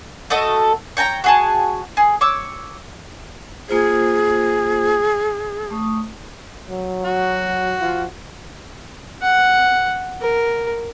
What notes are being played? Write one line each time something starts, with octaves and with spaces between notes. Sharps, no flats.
A3 F#4 A4 D#5
C#5 G5 A5 A#5
F#4 G#4 A5
G#4
C#5 D6 E6
A#3 F4 G#4 C5
A3 C#6 D#6
F#3
F#4
F3 F4
F#5
A#4